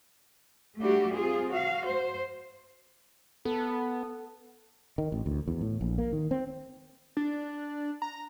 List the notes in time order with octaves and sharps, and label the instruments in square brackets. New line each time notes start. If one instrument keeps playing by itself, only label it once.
[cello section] G3 A3 D4 F#4 G4
C4 F4 G#4
F#4 F5
C5
[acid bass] B3 [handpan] A4
[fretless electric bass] D#3
A1
D2
E2
A2
A#1
A#3
D#3
C4
[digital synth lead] D4
A#5